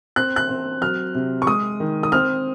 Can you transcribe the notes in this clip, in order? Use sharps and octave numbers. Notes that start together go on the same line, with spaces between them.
C4 F#6
F#6
C4
F#3 F6
C3
C#6
G#3 D#6
D#3
D#6
C4 F6